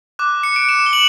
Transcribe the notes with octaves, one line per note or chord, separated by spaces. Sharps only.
D6 F#6
C#7
D7
E7
G7
F#7